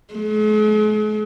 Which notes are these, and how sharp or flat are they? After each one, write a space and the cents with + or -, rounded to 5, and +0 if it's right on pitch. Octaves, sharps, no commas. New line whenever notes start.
G#3 +45